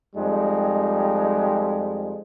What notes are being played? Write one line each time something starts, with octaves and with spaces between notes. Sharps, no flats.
F2 G3 G#3 D#4